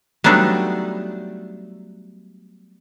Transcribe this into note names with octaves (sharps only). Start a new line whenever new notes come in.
F#3 G3 A3 B3 D4 D#4